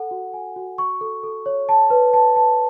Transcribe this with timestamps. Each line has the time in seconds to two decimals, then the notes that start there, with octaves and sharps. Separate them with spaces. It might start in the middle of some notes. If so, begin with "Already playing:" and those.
Already playing: A4 F#5
0.11 F#4
0.33 G#5
0.56 F#4
0.78 C#6
1.01 A4
1.24 A4
1.46 C#5
1.69 A5
1.90 B4
2.13 A5
2.36 A5